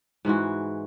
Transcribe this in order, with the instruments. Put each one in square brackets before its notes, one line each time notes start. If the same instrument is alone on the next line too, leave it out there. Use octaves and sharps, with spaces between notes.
[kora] G#2 E3 G#3 F#4